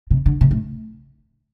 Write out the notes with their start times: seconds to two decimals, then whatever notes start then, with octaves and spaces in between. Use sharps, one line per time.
0.10 C3
0.26 D3
0.41 C3
0.51 A2